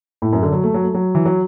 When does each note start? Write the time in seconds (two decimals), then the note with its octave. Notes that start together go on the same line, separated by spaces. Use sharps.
0.22 A2
0.33 F#2
0.42 D3
0.52 F#3
0.64 A3
0.74 F#3
0.84 A3
0.94 F#3
1.15 E3
1.26 F#3